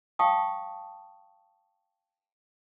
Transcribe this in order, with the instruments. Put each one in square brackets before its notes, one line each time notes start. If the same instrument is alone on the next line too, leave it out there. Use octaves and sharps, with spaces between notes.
[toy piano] F5 G5 A5 C#6 D#6